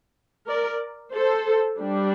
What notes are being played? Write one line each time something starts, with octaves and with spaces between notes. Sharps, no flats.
A#4 D5
A4 C5
G3 D4